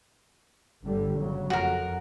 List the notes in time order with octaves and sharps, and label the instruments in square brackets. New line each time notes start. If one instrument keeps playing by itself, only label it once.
[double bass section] G1 D3 G3
C#3 F#3
[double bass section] F2 [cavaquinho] F#4 A#4